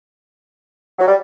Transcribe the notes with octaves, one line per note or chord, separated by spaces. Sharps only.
F#3
G3